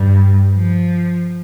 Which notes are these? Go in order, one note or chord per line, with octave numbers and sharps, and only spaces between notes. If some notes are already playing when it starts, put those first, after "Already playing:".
Already playing: G2
F3